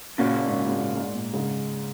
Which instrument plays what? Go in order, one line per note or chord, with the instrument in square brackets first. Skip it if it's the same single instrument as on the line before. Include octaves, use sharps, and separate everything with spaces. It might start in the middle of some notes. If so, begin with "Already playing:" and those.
[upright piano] A#2 [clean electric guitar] C#3 A#3 C#4 F#4
[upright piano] G#2
G#2
A#2
G#2
A#2
G#2 C#3